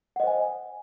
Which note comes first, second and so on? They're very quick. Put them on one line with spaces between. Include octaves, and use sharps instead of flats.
F#5 D#5 C5 G#5